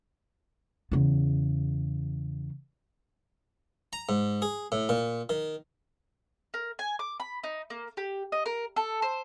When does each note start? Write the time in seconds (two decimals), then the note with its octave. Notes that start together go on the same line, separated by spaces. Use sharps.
0.92 E2 C#3
3.93 A#5
4.09 G#2
4.42 G#4
4.72 A2
4.89 A#2
5.29 D#3
6.54 A#4
6.79 G#5
6.99 D6
7.20 B5
7.44 D#4
7.70 A#3
7.97 G4
8.32 D#5
8.46 A#4
8.76 A4
9.02 C5